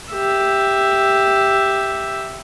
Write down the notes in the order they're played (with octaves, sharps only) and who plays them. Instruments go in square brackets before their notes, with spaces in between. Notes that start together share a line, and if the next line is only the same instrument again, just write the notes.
[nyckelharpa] G4 E5